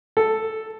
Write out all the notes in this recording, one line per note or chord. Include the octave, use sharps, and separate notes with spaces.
A4